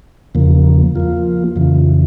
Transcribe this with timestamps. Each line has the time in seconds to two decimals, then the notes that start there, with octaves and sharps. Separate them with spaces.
0.35 E2 C#3 F3 A#3
0.96 F3 A#3 F4
1.56 F2 C#3 E3